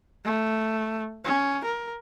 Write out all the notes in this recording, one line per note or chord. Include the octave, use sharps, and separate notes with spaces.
A3
C#4
A#4